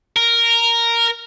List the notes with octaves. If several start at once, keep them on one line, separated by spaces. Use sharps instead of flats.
A#4